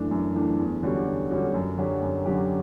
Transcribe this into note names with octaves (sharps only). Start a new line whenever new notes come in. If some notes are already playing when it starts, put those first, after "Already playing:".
Already playing: F#2 E3 A3 D4
F#2
E3 A3 D4
E2
D3 G3 C#4 F#4
E2
D3 G3 C#4 F#4
F#2
D3 F#3 C#4 G4
F#2
D3 F#3 C#4 G4